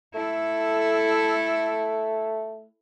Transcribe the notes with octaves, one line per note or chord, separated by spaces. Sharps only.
A3 E4 A4